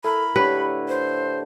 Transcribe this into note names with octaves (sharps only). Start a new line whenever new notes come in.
E4 A4 A#4 B5
A2 D3 G4 B4 C#6
C5